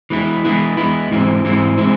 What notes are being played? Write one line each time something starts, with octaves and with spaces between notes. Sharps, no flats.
E3 G#3 B3 E4
E3 G#3 B3 E4
E3 G#3 B3 E4
G#2 E3 G#3 C4 E4
G#2 E3 G#3 C4 E4
E3 G#3 C4 E4